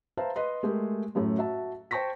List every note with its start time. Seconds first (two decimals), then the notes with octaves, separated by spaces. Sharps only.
0.17 B4 C5 E5 F5 A5 A#5
0.36 B4 D#5 C6
0.63 G#3 A3 G4 A#4
1.15 F#2 A2 A3
1.38 F#4 E5 A5
1.91 C5 G5 A5 C#6 A#6 B6